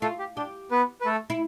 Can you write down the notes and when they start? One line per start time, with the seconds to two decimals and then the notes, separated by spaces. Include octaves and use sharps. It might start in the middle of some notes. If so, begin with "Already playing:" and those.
0.02 A3 F4 A4
0.19 G4
0.37 D4 G4
0.71 B3 B4
1.01 B4
1.06 A3 A4
1.30 E4